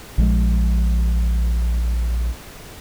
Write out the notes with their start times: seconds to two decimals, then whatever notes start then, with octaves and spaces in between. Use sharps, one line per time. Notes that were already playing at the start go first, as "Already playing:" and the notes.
0.18 A#1 F3 G#3